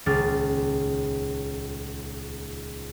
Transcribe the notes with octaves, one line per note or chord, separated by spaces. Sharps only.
D#1 C#2 D6 F6 A6